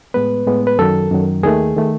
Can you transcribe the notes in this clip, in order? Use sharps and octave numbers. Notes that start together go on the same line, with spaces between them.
A2 G#3 B3 B4
A2 G#3 B3
B4
F#2 D#3 F#3 A4
F#2 D#3 F#3
D#2 D#3 A3 G#4
D#3 A3